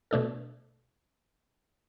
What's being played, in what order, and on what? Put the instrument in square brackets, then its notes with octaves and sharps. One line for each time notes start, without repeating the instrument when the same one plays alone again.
[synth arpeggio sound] B2 A3 D4 A4